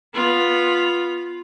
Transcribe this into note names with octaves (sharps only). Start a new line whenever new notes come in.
B3 F4